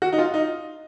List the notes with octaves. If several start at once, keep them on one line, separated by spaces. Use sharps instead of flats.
F#4
D#4
F4
D#4